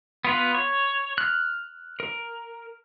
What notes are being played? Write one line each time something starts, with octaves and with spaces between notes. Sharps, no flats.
B3 F4 B4
C#5
F6 F#6
A#4